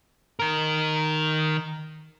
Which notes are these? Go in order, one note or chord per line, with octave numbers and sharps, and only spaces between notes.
D#3 A#4